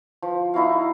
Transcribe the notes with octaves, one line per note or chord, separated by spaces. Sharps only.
F3
D#4 E4 F#4 F5